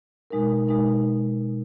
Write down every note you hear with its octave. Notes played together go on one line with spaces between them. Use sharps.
B2 G#3 D#4 A#4
B2 G#3 D#4 A#4